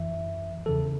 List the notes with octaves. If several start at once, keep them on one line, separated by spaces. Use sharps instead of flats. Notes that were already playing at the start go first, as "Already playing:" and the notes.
Already playing: F#2 E3 E5
E2 C#3 E3 A4